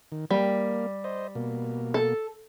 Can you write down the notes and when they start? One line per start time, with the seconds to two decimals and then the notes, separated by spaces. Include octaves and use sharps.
0.12 D#3
0.30 G3 A#3
1.04 C5 D#5
1.35 B2 A#3
1.94 A4